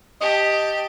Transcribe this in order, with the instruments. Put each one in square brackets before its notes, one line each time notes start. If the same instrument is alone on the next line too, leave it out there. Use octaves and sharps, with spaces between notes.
[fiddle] G4 A5 [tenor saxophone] D#5